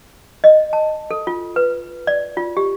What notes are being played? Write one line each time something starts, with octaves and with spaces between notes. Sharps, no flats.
D#5
A5
A4
F4
B4
D5
F4
G4